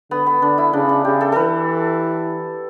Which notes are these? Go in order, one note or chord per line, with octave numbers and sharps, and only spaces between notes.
D3 B3
B3
D3 D4
E4
C#3 D4
D4
C#3 G4
A4
E3 A4 B4